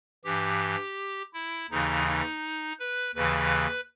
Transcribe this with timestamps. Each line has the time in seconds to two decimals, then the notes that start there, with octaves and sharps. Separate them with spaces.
0.24 G2 E3 G4
1.33 E4
1.71 D#2 C#3 E3 D#4
2.07 D#4
2.79 B4
3.15 D#2 C#3 E3 B4